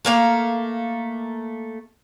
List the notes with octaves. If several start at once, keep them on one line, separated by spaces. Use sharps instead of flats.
A3 A#3 F5